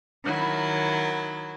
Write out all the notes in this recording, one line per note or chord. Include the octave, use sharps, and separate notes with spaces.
D#3 F#3 E4